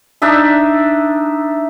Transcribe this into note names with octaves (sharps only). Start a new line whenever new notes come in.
D4 D#4 E5 A5